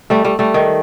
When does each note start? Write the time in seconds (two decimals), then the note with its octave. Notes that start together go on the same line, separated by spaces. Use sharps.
0.10 G3 A3
0.25 G3 A3
0.39 G3 A3
0.54 D#3